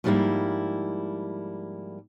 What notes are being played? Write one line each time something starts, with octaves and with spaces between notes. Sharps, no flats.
G#2 F3 G3 A3 A#3 E4